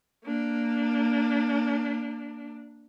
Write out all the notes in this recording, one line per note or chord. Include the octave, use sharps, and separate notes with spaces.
A#3 D4